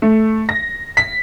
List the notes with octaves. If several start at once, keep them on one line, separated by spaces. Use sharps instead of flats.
A3
A#6
B6